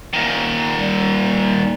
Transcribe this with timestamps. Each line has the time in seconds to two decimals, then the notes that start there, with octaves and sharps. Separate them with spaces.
0.13 A#2 D#3
0.76 G3